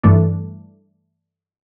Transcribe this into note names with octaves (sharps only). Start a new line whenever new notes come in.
G2 E3 A3 D4